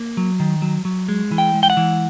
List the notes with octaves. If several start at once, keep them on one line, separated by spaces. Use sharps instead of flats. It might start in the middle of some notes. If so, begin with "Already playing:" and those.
Already playing: A#3
F#3
D#3
F#3
F#3
G#3
E3
G5
G#3
G5
F#5
E3